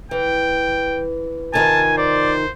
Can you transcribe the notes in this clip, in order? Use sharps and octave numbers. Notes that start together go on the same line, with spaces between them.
E3 G5
C3 D#3 F4 G#5 A5
C5 D5